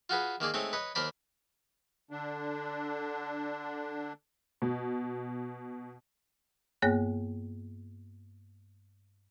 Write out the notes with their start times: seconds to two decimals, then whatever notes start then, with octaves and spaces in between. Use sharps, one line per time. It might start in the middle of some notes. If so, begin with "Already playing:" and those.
0.09 F4 F#4 G#4 B4
0.40 D#3 A#3 G#4 D5
0.54 G#3 A3 C4 D#4 C#5
0.73 B4 C#5 D#5
0.95 D#2 A#4 C5 D5 B5
2.11 D3 D4
4.62 B2
6.82 G2 A#3 B3 G#4 C#5 F#6